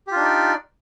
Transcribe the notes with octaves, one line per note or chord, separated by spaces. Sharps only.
D4 D#4 F4 G4 D5